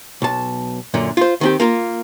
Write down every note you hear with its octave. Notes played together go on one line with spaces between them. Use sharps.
B1 A5
F#2 A#2 D3
F4 C5
D#3 C4 G4
A#3 F4 A#4